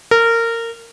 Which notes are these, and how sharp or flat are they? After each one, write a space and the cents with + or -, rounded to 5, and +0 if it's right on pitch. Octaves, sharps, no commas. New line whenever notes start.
A#4 -20